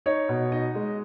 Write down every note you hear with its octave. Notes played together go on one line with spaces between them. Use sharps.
D#4 C#5
B2
D#4 D#5
G#3